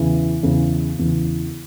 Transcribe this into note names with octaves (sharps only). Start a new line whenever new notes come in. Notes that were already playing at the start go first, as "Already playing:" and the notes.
Already playing: E2 C#3 E3
E2 C#3 E3
E2 C#3 E3